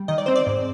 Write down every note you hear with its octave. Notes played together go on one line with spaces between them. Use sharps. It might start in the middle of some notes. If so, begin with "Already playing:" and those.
Already playing: G3
D#3 D#5
D5
C4 C5
D5
G#2